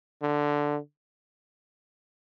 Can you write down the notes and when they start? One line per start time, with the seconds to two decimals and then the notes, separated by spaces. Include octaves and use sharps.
0.23 D3